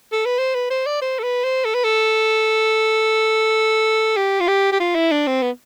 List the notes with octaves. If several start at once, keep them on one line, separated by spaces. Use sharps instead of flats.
A4
B4
C5
B4
C5
D5
C5
A4
B4
C5
A4
B4
A4
G4
F4
G4
G4
F4
E4
D4
C4
B3